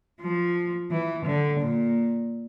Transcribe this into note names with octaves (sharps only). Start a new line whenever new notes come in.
F3
E3
D3
A#2